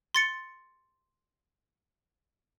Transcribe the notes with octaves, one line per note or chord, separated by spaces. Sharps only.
C6 A6 C#7